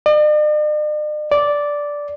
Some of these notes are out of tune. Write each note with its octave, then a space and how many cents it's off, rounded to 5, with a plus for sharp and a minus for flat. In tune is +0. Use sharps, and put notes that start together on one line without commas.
D5 +45
D5 -10